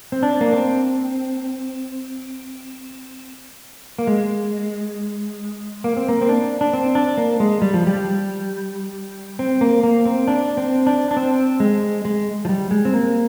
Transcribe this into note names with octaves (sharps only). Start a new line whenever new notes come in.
C4
D4
A#3
C4
A#3
G#3
A#3
C4
A#3
C4
D4
D4
C4
D4
A#3
G#3
G3
F3
G3
C4
A#3
A#3
C4
D4
C4
D4
D4
C4
G#3
G#3
F3
G3
G#3
C4
A#3